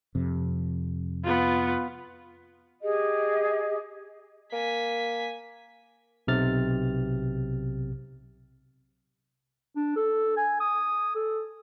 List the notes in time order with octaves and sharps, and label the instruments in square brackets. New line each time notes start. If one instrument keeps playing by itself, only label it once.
[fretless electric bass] F2 C3
[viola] B3 F4
[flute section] G4 G#4 D#5
[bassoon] A#3 [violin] G#5 B6
[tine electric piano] B1 C3 F6 A6
[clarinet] D4
A4
G#5
D#6
A4